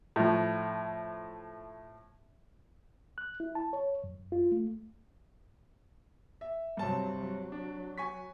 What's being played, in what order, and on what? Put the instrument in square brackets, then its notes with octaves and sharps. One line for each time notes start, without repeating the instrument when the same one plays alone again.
[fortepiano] A2 F3
[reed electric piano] F#6
E4
A5
C#5
F#2
F4
A3
[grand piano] E5
[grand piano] G2 A5 [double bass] C3 F#3
[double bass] F#3
[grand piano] D4
G#5 C#6 B6